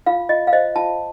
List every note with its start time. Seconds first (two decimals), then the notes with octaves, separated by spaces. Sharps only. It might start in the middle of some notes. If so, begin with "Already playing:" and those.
0.06 F4 F5
0.29 F4 D#5
0.47 F5
0.53 C5 D#5
0.76 F4 A5